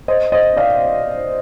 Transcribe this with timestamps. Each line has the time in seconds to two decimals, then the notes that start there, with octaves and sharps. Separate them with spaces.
0.08 C5 D#5
0.32 C5 D#5
0.57 D5 F5